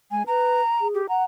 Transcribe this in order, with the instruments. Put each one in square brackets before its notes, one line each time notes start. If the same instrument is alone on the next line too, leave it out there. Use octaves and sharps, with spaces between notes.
[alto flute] G#3 [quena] G#5
[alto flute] B4 [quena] A#5
[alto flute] G#4
[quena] G4
[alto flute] F#5 [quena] A#5